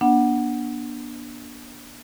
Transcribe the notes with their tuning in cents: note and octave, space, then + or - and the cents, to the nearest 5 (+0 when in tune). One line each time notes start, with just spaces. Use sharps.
B3 -45 D4 +0 F#5 +5